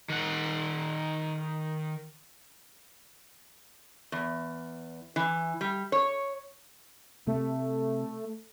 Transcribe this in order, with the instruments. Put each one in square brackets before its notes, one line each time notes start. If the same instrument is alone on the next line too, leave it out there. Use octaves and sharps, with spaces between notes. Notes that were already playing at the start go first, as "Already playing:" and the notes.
[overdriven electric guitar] D#3 F#5
[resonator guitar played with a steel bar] E2
E3
G3
C#5
[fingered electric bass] C3 [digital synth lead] A3